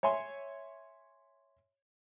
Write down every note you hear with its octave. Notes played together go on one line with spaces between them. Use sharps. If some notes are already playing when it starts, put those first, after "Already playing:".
C#5 E5 G#5 C6